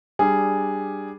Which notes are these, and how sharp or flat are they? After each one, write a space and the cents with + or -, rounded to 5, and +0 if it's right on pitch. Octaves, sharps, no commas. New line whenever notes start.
G3 +0 D4 +10 G#4 +0